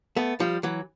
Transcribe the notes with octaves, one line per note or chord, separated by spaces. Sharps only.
A3 B3
F3 G3
E3 F#3